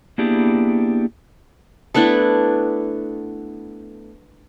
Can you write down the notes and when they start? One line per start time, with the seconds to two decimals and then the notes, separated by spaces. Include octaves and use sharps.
0.18 A#3 B3 D4 E4 G4 G#4
1.94 A3 B3 D4 E4